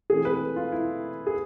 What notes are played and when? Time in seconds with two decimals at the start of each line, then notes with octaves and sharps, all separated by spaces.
0.10 E3 A3 C4 G#4
0.25 B4
0.56 F4
0.72 E4
1.27 G#4